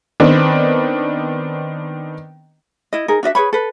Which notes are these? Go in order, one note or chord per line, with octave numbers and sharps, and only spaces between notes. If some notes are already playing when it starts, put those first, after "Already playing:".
D#3 B3 C4 D4
E4 D#5
D#4 G#4 A#4
D4 F#4 D#5 E5
G#4 B4 C#5 B5
A4 B4